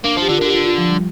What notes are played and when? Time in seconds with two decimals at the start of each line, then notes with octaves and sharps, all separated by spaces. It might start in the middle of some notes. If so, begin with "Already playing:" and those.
0.04 A#3 D4
0.17 F3
0.22 G4
0.29 D3 F4
0.38 A#4
0.42 D3
0.47 G4
0.53 F4
0.66 F4
0.78 F3
0.90 G3